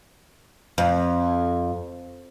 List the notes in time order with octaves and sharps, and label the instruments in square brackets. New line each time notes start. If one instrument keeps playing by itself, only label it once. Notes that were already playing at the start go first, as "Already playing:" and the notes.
[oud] F2